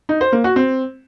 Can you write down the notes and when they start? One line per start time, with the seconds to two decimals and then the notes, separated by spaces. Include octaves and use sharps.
0.09 D#4
0.21 C5
0.32 A#3
0.44 F#4
0.56 C4